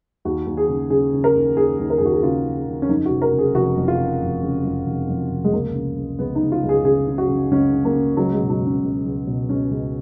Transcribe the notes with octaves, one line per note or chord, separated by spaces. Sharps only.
D#2 F#4
D#2
G#4
C#3
C#3 G#4
C#3
A#4
D#2
D#2 G#4
D#2
A#4
D#2 G#4
F#4
G#4
C#3 F4
C#3
C#3
C#4
F2 D#4
F#4
F1
A#4
C#3
G#4
F1 F#4
F2
F4
C#3
F1
C#3
F2
F1
F2
F1
G#3
C#2 A#3
C#3
C#2
C#2 B3
D#4
C#2
F4
C#2
G#4
C#3 G#4
C#3
F#4
C#3
C#2 C#4
C#3
A#3
C#3
C#2 F#3
G#3
B2
F#3
C#2
C#4
C#2
C#2
B2
C#2 C#4
C#2